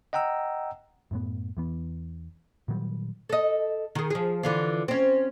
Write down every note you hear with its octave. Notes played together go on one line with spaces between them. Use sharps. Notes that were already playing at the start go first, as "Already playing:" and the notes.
D#5 F#5 G5 A#5 E6
F#2 A2 B3
E2 E3 B3
A#2 D#3 F#3 G3
A4 D#5
D#3 G#4
F3 G#4
D3 E3 F4
C4 C#4